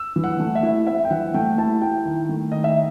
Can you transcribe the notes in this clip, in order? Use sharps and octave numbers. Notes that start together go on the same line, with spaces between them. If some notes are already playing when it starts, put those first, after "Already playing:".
Already playing: E6
E3
F#5
A3
E5
E4
C4 E5
G5
E3 F#5
A3 G5
E4 A5
E4 G5
D#3
A3
D#3 D#5
E5